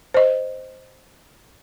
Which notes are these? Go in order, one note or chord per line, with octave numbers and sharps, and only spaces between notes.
C5 D#5